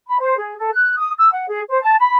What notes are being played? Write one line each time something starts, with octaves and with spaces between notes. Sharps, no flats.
B5
C5
G#4
A4
F#6
D#6
E6
F#5
G#4
C5
A5
B5